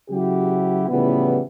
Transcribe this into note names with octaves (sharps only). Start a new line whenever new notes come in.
C#3 F#3 E4 F#4 G4
A2 C#3 E3 F3 G3 B3